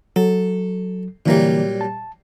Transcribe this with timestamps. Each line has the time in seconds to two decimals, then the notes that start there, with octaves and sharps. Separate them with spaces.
0.16 F#3 A4
1.26 A#2 D3 E3 F#3 G3 A#3
1.81 A5